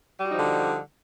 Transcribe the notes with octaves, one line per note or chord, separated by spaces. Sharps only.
D3 F3 G3 D#4 F#4